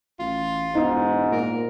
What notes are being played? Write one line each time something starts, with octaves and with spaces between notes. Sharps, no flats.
A1 F4
E1 G#2 D#4
A#2 A#4